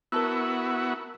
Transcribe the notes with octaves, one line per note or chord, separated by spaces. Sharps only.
B3 E4 F#4 A#4 A5 E6